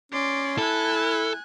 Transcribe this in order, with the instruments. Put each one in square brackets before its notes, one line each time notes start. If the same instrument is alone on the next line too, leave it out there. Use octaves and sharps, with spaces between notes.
[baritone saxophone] C#4 [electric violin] D5 C6
[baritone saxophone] E4 [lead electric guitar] A4 [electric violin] G#5 F#6